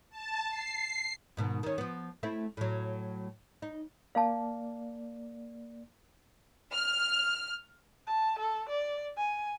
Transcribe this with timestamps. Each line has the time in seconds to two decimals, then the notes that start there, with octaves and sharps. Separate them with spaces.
0.10 A5
0.49 C7
1.37 G#2 B2 D#3
1.63 D#3 C#4
1.78 F3 B3
2.23 A3 C4 E4
2.57 A2 F#3
3.62 D#4
4.15 A#3 D5 F5 A5
6.73 F6
8.07 A5
8.39 A4
8.69 D5
9.17 G#5